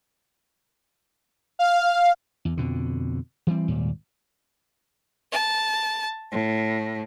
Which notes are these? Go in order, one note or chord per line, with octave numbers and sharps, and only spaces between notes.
F5
E2
F2 B2 D3
E3 G3 C4
G#1 D#2 A#2 G3
A5
A2